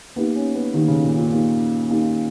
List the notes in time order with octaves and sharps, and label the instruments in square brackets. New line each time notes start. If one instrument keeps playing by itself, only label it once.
[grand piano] A#3 D#4 G4 [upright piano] B3
[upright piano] C#4
B3
[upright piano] D#3 [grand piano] A#3 D#4 G4
[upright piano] C#3
A#2
A#2
[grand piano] A#3 D#4 G4
A#3 D#4 G4